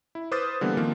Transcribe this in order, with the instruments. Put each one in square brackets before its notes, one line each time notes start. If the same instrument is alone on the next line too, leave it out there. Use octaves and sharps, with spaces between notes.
[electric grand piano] E4
B4 C5 D6 D#6 F6 A6
D3 E3 G3 A#3 B3
D#3 F3 A#3 C4